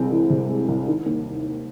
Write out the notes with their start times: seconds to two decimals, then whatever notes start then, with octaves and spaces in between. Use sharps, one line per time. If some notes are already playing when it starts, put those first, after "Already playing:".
Already playing: C2 G#3 C4
0.11 E3
0.30 C3
0.49 G#3
0.68 C2
0.87 D#3
1.06 D#2